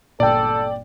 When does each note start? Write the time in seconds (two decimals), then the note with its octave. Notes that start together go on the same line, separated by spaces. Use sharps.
0.20 G1 A#2 A4 D5 G5